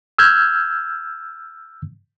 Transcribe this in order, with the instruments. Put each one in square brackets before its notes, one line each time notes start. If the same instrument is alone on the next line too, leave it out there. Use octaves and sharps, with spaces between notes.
[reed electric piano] E6 F6 G6 G#6